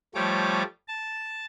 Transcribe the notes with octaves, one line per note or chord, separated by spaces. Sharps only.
F3 G3 A3 C#5 D6
A5